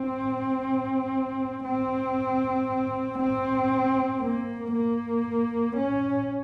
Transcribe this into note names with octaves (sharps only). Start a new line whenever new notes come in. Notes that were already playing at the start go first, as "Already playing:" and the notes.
Already playing: C4
C4
C4
A#3
A#3
C#4